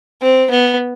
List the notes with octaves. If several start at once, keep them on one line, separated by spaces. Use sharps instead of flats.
C4
B3